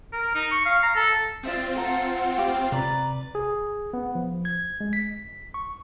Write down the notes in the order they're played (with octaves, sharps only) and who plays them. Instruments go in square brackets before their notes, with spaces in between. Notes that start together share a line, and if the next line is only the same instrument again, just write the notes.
[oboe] A#4
D#4
C#6
F5
A#5
A4
[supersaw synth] C4 F4 [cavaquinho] D5 E5 D#6
[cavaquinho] A4 A#5 [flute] F#5
[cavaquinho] G4 B4 D6 [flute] F5
[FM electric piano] C3 [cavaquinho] B4 D5 [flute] A#5
[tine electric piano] G#4
B3
F3
G#6
G#3
B6
C#6